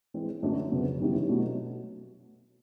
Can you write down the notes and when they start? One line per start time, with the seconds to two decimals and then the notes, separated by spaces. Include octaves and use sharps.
0.14 E3 G#3 C4
0.42 F#2 D3 F#3 A3 D4
0.71 F2 C#3 F#3 B3
1.01 F#2 D#3 G3 B3 E4
1.29 B2 F#3 A3